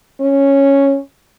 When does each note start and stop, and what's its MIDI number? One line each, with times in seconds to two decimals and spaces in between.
0.21 0.98 61